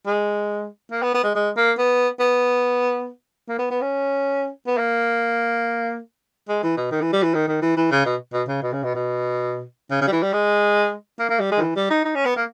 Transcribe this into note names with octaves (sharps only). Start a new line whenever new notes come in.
G#3
A#3
B3
B3
G#3
G#3
A#3
B3
B3
A#3
B3
B3
C#4
B3
A#3
G#3
E3
B2
D#3
E3
G3
E3
D#3
D#3
E3
E3
C#3
B2
B2
C#3
B2
C#3
B2
B2
C#3
C#3
G3
E3
G3
G#3
A#3
A#3
G3
G#3
D#3
E3
G3
D#4
D#4
C#4
B3
A#3